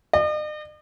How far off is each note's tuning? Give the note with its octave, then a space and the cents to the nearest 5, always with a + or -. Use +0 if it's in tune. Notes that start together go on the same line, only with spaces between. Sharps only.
D#5 -45